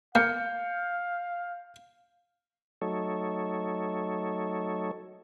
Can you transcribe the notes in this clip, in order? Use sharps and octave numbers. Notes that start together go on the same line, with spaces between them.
A#3 F5 F6 G6 C#7
F#3 A3 D#4 A4 C#5